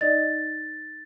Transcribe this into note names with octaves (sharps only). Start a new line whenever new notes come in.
D#4 D5 D#5 A6